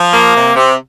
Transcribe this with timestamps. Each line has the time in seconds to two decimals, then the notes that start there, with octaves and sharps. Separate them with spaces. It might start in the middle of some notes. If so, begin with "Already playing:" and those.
Already playing: F3
0.12 A#3
0.34 C3
0.56 C3